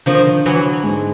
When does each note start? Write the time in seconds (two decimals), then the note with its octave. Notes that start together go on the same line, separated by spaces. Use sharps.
0.06 D3 D#3 F3 D4
0.46 E3 F#3
0.83 G#2 G#3